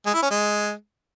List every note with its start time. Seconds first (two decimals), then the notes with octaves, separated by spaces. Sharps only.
0.06 G#3
0.14 E4
0.22 C#4
0.31 G#3